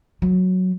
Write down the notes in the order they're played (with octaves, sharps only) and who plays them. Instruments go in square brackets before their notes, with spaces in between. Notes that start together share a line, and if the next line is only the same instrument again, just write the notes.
[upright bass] F#3